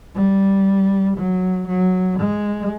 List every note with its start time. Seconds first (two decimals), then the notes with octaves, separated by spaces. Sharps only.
0.15 G3
1.17 F#3
1.68 F#3
2.19 G#3